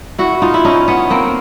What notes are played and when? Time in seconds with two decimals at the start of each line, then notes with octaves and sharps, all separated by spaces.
0.18 E4 F#4
0.42 D#4 F4
0.54 E4
0.65 C#4 D#4
0.88 B3 C#4
1.10 A#3 C4